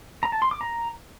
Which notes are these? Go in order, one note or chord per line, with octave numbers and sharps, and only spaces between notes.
A#5
A5
C6
D6
A#5